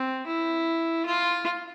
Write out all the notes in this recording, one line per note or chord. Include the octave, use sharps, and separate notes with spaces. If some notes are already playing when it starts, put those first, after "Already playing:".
Already playing: C4
E4
F4